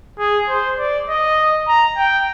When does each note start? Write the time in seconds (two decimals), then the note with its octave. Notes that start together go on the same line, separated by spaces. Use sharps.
0.19 G#4
0.49 C5
0.79 D5
1.09 D#5
1.68 A#5
1.98 G5